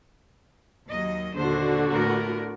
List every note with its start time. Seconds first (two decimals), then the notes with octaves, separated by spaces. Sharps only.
0.91 D#2 F#3 D#5
1.37 D#2 A#2 D3 F#4 C5
1.90 A2 B3 A#4